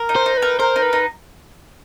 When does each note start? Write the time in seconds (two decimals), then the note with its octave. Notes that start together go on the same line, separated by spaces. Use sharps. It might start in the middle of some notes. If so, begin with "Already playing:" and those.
Already playing: A#4
0.09 D#4
0.16 C5
0.26 D#4
0.37 B4
0.42 A#4
0.59 A#4 C5
0.76 D#4
0.82 B4
0.93 D#4